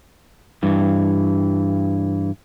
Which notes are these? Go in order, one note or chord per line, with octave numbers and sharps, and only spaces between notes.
G2 E3